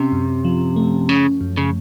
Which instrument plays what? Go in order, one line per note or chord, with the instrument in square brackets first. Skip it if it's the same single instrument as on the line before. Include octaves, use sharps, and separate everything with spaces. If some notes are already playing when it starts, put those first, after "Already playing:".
Already playing: [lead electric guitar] C3 [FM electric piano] C#4
[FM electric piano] F#2
F3
A3
[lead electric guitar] C#3 [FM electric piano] C#4
[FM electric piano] F#2
[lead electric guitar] C#3